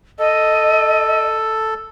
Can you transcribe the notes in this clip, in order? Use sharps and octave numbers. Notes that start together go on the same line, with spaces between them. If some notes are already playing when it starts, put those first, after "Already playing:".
A4 D#5